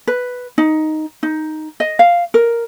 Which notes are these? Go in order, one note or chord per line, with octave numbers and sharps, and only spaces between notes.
B4
D#4
D#4
D#5
F5
A#4